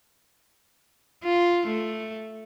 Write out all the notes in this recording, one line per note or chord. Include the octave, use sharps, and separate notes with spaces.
F4
A3